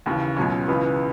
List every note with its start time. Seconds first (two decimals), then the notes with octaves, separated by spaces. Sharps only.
0.06 D#2 C#3 E3
0.37 C#2 B2 F#3 C#4
0.68 C#2 C#3 E3 B3